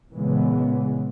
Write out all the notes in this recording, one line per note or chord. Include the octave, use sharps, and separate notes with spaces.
A#2 C#3 E3 G#3 B3